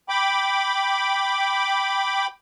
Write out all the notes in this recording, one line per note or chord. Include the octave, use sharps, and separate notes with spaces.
G5 B5 D6